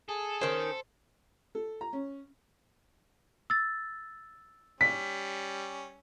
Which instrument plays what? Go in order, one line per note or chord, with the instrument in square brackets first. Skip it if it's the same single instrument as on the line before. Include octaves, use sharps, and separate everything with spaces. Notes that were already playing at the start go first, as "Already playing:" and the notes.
[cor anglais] G#4 [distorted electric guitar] A4
[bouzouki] D#3 C#4 [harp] C5
[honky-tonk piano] A4
A#5
C#4
[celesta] E6 A6
[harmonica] G3 C#4 [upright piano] B6